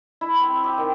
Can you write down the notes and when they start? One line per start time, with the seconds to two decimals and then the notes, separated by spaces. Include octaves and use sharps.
0.21 E4
0.41 C4
0.64 G4
0.78 D#3